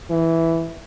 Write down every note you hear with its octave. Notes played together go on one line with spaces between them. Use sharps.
E3